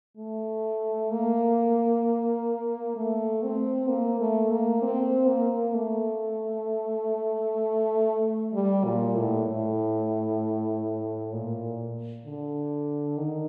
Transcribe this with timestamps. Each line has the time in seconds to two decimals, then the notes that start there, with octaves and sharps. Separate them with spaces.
0.17 A3
1.10 A#3
2.96 A3
3.43 C4
3.88 A#3
4.20 A3
4.51 A#3
4.82 C4
5.28 A#3
5.74 A3
8.53 G3
8.84 A#2
9.15 A2
9.46 A2
11.32 A#2
12.25 D3
13.17 D#3